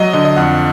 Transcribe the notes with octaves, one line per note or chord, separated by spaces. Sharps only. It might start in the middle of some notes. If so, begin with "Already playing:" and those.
Already playing: F#3 D#5
D3 D#5
D#5
F2 F#5